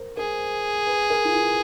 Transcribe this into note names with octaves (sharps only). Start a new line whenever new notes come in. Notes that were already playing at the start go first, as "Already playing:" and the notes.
Already playing: A#4 C5
G#4 A#4
B4
A#4
F4
E4